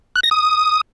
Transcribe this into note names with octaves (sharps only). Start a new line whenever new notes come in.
F#6
A#6
D#6